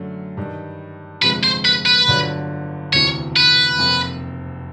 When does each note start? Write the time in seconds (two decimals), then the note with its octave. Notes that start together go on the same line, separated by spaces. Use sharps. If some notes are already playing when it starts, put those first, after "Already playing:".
Already playing: F#2 D3 F#3 A3
0.37 G2 D#3 G3
1.22 G1 F2 C3 F3 G#3 B4
1.43 C5
1.65 B4
1.86 B4
2.08 G1 G2 D3 F#3
2.93 E1 D2 C3 E3 C#5
3.36 B4
3.78 F1 F2 C3 F3 A#3